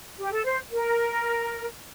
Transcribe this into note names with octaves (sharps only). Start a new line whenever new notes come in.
G4
A4
C5
A#4